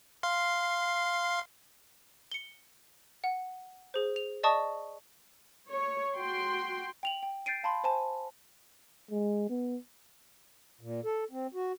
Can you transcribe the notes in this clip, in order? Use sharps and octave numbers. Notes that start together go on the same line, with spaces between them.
F5 C6
C#7 G7
F#5
G#4 C5
F7
D5 D#5 A5 C#6 D#6
C#5
F#4 G5 C6
G5 F7 F#7
G5
G6 A6 C7 D7 D#7
F5 A5 B5 C6
C5 G#5 A5
G#3
B3
A#2
A4
C4
F#4